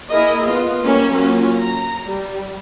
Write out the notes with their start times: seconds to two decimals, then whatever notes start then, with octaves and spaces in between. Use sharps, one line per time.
0.10 A#3 E4 G#4 A#4 D#5
0.43 B3 F4 D#5
0.83 G3 A#3 C#4
1.12 F#3 A#3 C#4 F4
1.56 A#5
2.05 G3